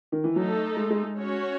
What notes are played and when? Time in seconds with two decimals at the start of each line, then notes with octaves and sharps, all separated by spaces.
0.12 D#3
0.24 E3
0.36 F#3 A3 D#4 A4
0.77 G#3
0.90 G#3
1.03 G#3
1.17 C#4 F#4 C#5